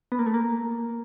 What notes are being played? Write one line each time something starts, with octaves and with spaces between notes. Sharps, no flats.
B3
A#3
A3
A#3